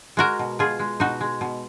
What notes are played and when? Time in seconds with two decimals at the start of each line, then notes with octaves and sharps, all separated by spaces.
0.17 G#3 F#4 A#4
0.39 B2
0.59 B2 F4 G#4
0.79 G#3
1.00 B2 D#4 F#4
1.21 G#3
1.41 B2